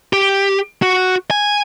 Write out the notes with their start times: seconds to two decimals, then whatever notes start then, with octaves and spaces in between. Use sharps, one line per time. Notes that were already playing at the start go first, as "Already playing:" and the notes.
0.13 G4
0.82 F#4
1.31 G#5